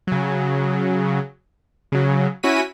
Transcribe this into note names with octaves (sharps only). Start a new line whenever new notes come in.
C#3 F#3
C#3 F#3
C#4 E4 F#4 B6 D#7